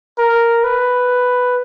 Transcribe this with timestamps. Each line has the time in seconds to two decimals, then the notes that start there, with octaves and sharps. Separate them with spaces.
0.18 A#4
0.64 B4